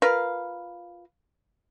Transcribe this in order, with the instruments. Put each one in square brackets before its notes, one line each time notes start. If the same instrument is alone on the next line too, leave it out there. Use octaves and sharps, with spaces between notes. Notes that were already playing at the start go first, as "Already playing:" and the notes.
[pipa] F4 A#4 B4 F5